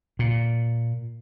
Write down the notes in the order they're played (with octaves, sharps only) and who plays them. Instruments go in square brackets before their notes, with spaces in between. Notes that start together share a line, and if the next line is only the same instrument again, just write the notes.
[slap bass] A#2